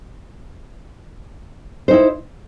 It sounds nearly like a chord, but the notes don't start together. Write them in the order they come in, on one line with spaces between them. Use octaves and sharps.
C5 D#4 E4